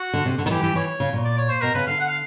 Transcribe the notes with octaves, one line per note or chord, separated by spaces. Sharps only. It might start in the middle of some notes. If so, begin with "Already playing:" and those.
Already playing: F#4
D3
C3
D3
D#3
E3 G4
E3 G4
E3 C#5
C#3
A#2
D5
C#5
C5
B2 A#4
C#3 B4
D3 F5
F#5
F5